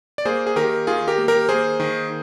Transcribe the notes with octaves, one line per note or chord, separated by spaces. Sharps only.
D5
A#3 G#4 C5
G#4
D#3 G4 A#4
D#3 F4 G#4
G4 A#4
A#3
G4 A#4
A#3 G#4 C5
D#3